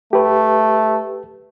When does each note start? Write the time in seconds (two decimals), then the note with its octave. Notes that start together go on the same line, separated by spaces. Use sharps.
0.13 A3 G4 B4